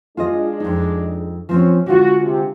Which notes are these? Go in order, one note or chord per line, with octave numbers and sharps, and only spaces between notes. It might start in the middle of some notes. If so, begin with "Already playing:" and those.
G#3 D4 F4 G#4 D#5
F2 D#4
F3 C4 C#4
D3 G#3 F4 F#4
C3